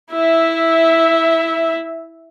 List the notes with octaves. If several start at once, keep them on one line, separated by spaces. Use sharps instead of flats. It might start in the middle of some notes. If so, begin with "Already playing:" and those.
E4 E5